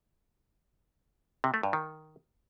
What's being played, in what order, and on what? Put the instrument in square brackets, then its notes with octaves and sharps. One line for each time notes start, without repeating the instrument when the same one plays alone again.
[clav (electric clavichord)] C3
A3
G2
D#3